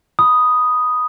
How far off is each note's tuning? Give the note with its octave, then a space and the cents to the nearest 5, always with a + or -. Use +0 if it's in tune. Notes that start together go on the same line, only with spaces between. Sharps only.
B5 +5 D#6 +0